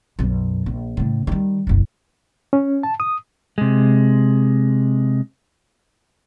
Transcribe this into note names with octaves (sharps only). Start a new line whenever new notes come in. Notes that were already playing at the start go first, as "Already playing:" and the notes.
B1 F#2
A#1
A2 C#3
D#3 G3
F#1 B1
C#4
A5
D#6
C3 G#3